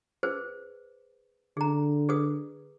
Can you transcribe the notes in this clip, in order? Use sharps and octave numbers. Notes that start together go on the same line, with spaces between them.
G#4 B4 C5
D3 G#4 A#5
G#4 B4 D#6